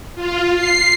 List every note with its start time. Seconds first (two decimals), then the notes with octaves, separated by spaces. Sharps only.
0.15 F4
0.55 C7